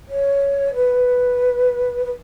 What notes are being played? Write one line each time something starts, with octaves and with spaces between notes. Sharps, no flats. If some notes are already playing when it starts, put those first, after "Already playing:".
C#5
B4
B4